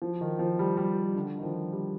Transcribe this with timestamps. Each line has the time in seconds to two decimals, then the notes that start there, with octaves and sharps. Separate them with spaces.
0.02 F3
0.21 D#3
0.39 F3
0.59 G3
0.77 G3
1.16 D3
1.38 D#3
1.43 F3
1.72 G3